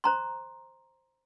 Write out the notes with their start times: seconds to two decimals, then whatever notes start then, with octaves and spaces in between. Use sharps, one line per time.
0.04 C5 A#5 C6